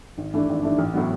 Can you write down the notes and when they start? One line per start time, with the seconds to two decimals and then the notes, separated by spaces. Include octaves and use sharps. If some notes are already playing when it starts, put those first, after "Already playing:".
0.18 G#1
0.33 G2 E3 A3 D4
0.49 G#1
0.63 G2 E3 A3 D4
0.79 A1
0.94 A2 F#3 B3